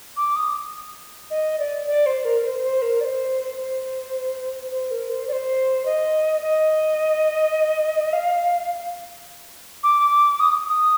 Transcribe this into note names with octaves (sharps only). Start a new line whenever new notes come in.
D6
D#6
D#5
D5
D5
C5
A#4
C5
C5
A#4
D5
C5
C5
C5
A#4
C5
D5
C5
D#5
D#5
F5
D6
D#6
D#6